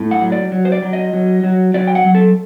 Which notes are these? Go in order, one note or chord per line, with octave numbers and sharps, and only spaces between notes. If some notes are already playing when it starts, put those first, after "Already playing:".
Already playing: A2
F#5
F#3
D5
F#3
C5
D5
F#3
D#5
F#3
F#3
F#3 D5
G5
F#5
F#3
A4